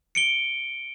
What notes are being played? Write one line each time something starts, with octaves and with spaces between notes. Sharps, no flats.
C#7 D7 G7